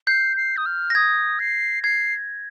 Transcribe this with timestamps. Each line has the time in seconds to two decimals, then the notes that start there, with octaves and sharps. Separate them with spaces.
0.07 G6 C7
0.37 C7
0.57 D#6
0.66 F6
0.90 A#6
0.95 D#6 G#6
1.40 C7
1.83 G#6 C7